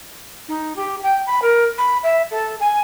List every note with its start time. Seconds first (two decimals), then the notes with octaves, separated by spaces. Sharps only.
0.48 D#4
0.76 G4
1.03 G5
1.26 B5
1.42 A#4
1.77 B5
2.03 E5
2.30 A4
2.60 G#5